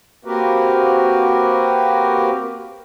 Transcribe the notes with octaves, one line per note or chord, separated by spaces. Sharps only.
A#3 C4 F#4 G4 A#4 B4